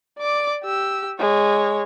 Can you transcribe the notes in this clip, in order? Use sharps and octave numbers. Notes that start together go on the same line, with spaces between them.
D5 D6
G4 E6
G#3 C#5